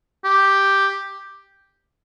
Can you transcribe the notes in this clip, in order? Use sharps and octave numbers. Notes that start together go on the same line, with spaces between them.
G4